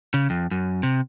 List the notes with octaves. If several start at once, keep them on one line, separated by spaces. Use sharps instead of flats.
C#3
F2
F#2
C3